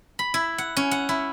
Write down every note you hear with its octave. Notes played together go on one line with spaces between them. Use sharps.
B5
E4
F#5
C#4
F#5
E4